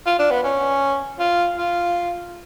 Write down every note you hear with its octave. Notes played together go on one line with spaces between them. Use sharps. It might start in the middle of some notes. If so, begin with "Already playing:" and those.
F4
D4
B3
C#4
F4
F4